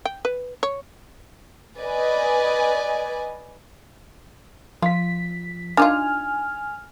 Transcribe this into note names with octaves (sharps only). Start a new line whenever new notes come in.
G5
B4
C#5
B4 D5 D#5 G#5
F3 F4 B6
D4 D#4 F4 G#5 F6